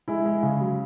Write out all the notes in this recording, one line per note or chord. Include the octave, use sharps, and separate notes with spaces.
G#3 E4
G#3
C#3
F#3